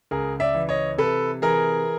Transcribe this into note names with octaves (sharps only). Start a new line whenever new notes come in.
C#2 G#4 A#4
D5 E5
E3
C#5 D#5
C3 A4 B4
E3 G#4 A#4